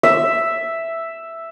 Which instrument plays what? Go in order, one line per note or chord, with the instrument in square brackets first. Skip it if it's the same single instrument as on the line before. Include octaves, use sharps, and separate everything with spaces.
[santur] E5